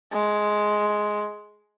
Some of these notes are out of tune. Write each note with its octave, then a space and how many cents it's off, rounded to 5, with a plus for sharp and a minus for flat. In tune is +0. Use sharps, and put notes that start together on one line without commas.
G#3 +10